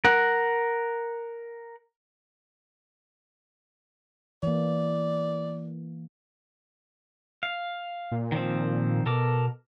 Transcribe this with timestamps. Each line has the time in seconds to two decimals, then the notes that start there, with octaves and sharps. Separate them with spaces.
0.05 A#4 F#5
4.43 E3 A#3 D5
7.43 F5
8.12 A#2
8.32 D#3 F3 C4
9.06 B2 A4 A#4 D6